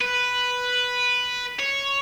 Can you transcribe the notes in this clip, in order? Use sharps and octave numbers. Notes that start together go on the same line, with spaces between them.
B4
C#5